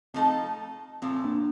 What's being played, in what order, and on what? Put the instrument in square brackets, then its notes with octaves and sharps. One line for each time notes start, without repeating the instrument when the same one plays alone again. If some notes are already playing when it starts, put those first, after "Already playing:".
[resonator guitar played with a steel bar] F3 A3 D#4 A4 [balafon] C4
[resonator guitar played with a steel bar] A#2 F3 A3 [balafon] C4
[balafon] A#3 D4